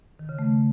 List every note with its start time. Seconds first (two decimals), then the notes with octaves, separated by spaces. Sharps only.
0.19 D#3
0.29 C#3
0.39 A3